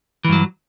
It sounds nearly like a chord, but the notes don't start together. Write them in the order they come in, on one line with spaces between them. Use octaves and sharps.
E3 G2 F#3